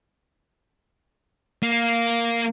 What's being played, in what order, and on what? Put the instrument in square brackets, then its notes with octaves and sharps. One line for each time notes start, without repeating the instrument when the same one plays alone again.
[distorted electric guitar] A#3